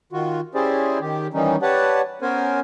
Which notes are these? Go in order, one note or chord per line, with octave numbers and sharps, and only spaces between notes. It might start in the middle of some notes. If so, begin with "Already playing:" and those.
D#3 F4 F#4
C#4 E4 G4 G#4 C5 D5
D#3 G4
D#3 E3 G3 C#4 D#4
G4 B4 C#5 D5 F#5 A5
B3 C#4 A#4 C5 G#5